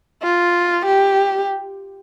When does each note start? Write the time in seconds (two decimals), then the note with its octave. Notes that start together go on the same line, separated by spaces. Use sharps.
0.23 F4
0.86 G4